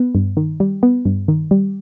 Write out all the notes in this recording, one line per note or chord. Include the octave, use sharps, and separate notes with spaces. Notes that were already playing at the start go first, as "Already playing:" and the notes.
Already playing: B3
G2
D#3
G3
B3
G2
D#3
G3